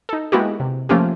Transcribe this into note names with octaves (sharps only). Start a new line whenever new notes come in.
D#4 A4
G#3 A#3 B3 E4 F#4 G4
C3
F3 A3 A#3 C#4 F4 G4